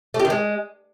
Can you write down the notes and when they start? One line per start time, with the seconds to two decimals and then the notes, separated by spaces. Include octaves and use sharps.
0.14 A3
0.20 G4
0.25 D#3
0.30 G#3